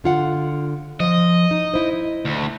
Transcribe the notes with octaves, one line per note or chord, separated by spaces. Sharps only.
D3 F4 F#5
F3 D#5
D#4
E4 C5
D2